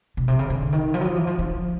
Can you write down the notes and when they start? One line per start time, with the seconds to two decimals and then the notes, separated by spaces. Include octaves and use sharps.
0.17 B2
0.28 C3
0.39 C#3
0.50 D3
0.73 D#3
0.94 F3
1.01 F#3
1.05 F3
1.16 E3
1.27 F3
1.39 F3